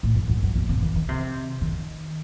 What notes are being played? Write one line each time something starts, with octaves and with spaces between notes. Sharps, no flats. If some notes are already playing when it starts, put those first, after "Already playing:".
A2
F#2
F#2
F#2
B2
C3
D#3
D#3
C3
D#3